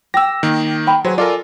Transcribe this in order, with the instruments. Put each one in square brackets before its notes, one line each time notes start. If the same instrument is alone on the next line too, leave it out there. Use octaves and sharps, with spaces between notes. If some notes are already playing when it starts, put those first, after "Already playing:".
[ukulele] G4 G5 [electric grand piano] E6 A#6
[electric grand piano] D#3 A#3
[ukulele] G5 B5
[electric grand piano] F#3 [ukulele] G#4 B4 C5
[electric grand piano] F4 A4 A#4 [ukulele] D5 G#5